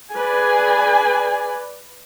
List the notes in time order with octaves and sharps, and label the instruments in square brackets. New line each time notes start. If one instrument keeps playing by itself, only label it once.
[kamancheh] G#4 G#5 [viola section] B4 D5